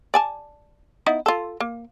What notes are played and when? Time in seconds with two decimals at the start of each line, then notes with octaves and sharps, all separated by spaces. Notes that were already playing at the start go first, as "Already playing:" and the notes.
0.14 D5 G#5 A5
1.06 B3 D#4 E4
1.26 F4 A4
1.60 A#3